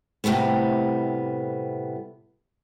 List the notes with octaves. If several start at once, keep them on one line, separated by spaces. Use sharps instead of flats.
A2 C3 G3 A3 B3